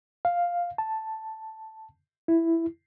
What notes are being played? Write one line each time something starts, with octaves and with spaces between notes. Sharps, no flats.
F5
A5
E4